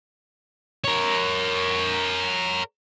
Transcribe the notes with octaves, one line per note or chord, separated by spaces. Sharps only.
A#4 C#5